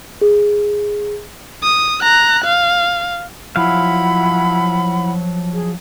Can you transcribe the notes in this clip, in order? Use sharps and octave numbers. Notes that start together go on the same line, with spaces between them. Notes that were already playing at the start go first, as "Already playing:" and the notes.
G#4
D#6
A#5 F#6
F5
F3 F#3 E4 F5 F#5 B5
G#4